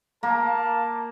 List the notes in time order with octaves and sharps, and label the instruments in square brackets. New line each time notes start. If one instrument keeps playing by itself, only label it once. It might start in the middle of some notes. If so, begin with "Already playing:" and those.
[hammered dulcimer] A#3 [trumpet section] A#4 A5